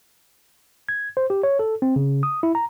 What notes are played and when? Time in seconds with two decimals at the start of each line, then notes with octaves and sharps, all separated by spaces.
0.89 G#6
1.17 C5
1.30 G4
1.43 C#5
1.59 A4
1.82 C4
1.96 C#3
2.23 D#6
2.43 E4
2.55 A#5